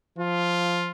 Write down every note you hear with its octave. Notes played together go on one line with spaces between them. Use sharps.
F3 F4